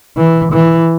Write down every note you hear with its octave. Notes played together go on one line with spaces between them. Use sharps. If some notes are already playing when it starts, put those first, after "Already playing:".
E3
E3